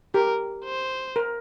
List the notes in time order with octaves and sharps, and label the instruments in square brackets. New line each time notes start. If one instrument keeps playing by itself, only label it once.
[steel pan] G4 [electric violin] A#4
[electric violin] C5
[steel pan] A#4